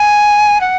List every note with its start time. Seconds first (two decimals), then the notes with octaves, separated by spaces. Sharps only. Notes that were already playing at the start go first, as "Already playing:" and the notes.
Already playing: G#5
0.61 F#5